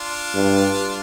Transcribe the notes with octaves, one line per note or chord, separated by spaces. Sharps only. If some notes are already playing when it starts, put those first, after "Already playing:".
Already playing: D4 F4
G2